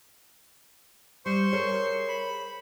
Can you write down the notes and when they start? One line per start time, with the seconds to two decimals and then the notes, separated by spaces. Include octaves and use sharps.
1.26 G3 C5 C6 C#6
1.53 G#4 A#4 C#5
2.08 B5